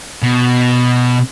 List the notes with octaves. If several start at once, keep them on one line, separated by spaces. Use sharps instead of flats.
B2